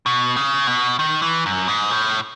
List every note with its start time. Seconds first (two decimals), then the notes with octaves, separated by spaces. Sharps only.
0.06 B2
0.36 C#3
0.67 B2
0.99 D#3
1.22 E3
1.46 F#2
1.68 G#2
1.91 A2